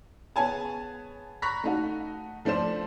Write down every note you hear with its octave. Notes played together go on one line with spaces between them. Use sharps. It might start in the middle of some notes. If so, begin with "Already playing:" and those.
B3 G#4 C#5 G#5 A5
A#5 B5 C#6 F#6 A#6 B6
A3 D#4 F#4
F3 A3 D4 C5 E7